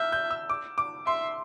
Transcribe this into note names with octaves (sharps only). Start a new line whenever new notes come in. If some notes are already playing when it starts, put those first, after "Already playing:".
Already playing: E5 F6 G6
G6
E6
D6
D6
E5 C6